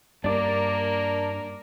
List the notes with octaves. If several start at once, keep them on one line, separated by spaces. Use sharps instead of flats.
G2 A#3 D4 A#4 D5